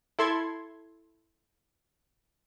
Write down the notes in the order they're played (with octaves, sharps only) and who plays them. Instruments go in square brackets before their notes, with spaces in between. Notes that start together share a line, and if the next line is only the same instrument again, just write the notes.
[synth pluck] E4 A4 C6 G#6